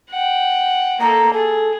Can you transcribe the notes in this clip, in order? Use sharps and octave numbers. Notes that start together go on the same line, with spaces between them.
F#5 G5
A#3 A4 A#5
G#4 A4